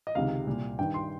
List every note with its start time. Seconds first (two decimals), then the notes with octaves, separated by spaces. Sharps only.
0.07 D#5
0.15 C#2 C3 D#3 F5
0.47 C2 A#2
0.79 G2 D#3 G5
0.94 C6